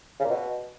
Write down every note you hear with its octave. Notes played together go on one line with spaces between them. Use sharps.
C#3
A#2
B2